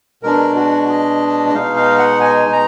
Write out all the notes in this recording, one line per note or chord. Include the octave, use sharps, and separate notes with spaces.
B2 G#3 D4 A#4
F#4
D#5
D#5
B2 G#3 D#4 F5
F5
F#5
G#5
A#5